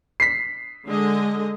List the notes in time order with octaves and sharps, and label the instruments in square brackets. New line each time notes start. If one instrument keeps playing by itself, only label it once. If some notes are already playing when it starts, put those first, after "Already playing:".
[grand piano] B6 C7
[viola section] D3 G#3 D#5